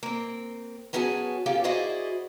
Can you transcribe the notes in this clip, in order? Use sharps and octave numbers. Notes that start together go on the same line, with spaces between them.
A#3 C4
F#3 B3 C#4 F#4 G#4 A5
A#3 C#4 F4 G4 A4
E4 F#4 G#4 C5 D5 D#5